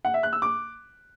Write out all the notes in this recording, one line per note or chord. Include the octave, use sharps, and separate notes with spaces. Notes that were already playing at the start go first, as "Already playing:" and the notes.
F#5
E5
F#6
E6
D6